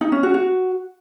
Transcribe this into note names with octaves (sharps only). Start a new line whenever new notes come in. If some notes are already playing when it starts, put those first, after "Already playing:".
D#4
C#4
F#4
F#4